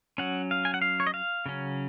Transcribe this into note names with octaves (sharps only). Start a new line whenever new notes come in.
F#3 C#4 F#5
F5
G#5
F#5
F5
C#5
D#5
F5
C#3 F#3 C#4